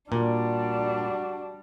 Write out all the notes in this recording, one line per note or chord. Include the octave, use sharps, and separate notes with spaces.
A#2 G3 D4 F#4